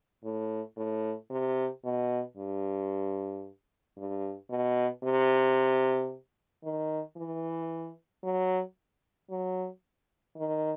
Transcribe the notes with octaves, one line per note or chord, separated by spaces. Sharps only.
A2
A2
C3
B2
G2
G2
B2
C3
D#3
E3
F#3
F#3
D#3